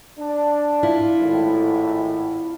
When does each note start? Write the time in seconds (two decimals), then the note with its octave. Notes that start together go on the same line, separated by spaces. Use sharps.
0.19 D4
0.83 E4 F4
1.19 G#1 A2